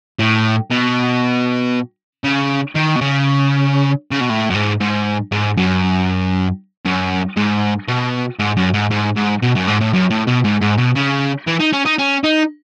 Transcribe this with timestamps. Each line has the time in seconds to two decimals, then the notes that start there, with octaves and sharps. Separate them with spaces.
0.19 A2
0.70 B2
2.24 C#3
2.75 D#3
2.96 B2
3.01 C#3
4.11 C#3
4.20 B2
4.30 A2
4.50 F#2
4.55 G#2
4.81 G#2
5.32 G#2
5.57 F#2
6.86 F#2
7.37 G#2
7.88 B2
8.39 G#2
8.57 F#2
8.74 G#2
8.91 G#2
9.16 G#2
9.42 B2
9.55 F#2
9.68 G#2
9.80 A2
9.93 F#2
10.10 A2
10.27 B2
10.45 G#2
10.62 G#2
10.78 B2
10.96 C#3
11.47 E3
11.60 D#4
11.73 C#4
11.85 D#4
11.98 C#4
12.24 D#4